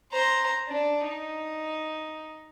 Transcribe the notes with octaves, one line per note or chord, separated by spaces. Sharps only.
C5 A#5
D4
D#4